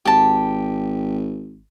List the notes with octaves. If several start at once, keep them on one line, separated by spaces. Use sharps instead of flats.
G#1 G4 A5